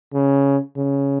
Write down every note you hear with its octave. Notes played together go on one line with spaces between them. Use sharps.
C#3
C#3